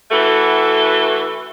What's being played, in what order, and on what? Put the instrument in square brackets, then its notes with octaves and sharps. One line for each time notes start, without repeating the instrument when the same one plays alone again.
[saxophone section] E3 A3 F#4 A4